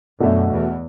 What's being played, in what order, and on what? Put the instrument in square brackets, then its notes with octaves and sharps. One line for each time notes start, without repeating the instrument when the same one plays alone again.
[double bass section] F#2 [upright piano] B2 A3 D4 A4 E5
[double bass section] E2